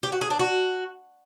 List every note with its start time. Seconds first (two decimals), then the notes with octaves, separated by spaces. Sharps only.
0.03 G4
0.12 F#4
0.21 G#4
0.30 D4
0.39 F#4